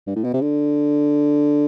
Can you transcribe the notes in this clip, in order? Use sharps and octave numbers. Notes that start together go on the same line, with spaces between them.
G2
A2
B2
C3
D3